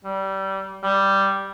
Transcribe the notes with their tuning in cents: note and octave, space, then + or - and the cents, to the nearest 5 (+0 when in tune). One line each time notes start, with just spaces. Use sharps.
G3 -20
G3 -5